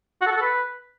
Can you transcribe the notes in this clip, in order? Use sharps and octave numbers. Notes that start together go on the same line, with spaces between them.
F#4
A4
F#4
A4
B4